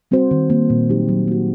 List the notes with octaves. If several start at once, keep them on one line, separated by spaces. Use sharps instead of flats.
G3 C4 F#4 C5
D#3
G3 A#3
A#2
F#3 A#3 D#4 G4
F#3
A#3 F#4